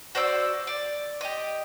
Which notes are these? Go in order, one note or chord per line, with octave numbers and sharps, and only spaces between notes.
F#4 C5 D5 E6
D5
G4 D#5